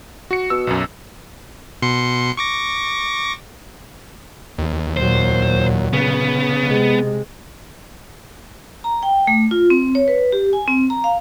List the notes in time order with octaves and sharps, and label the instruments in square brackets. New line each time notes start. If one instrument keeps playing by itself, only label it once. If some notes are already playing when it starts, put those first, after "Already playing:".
[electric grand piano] F#4 C#7
[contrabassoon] B2 [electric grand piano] E6
[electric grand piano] B1 F#2
[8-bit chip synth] B2 C6 C#7
C#6 D6 A#6
D#2
[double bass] A#2 F#3 [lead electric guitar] C5
[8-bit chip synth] C#3 [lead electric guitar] B3
[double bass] C3 G#3
[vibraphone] A#5
G5
A3
F4
C4
C#5
B4
G4
G#5
C4
A#5
F5